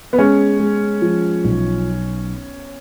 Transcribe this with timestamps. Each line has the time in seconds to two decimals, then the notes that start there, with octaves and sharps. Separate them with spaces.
0.13 B3
0.19 G#3 C#4
0.60 G#3
1.02 F3
1.44 B1